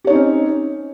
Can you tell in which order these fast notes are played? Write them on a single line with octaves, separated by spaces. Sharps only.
G4 C#5 D#4 C4 C#4